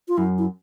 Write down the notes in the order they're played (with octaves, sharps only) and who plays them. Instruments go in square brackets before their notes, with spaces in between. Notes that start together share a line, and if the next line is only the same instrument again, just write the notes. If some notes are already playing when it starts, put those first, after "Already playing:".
[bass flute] F4
[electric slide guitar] F#2 [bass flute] E4
[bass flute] E4